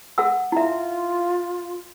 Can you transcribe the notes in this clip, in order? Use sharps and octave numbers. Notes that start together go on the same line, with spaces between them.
A4 F#5 E6
E4 F4 E5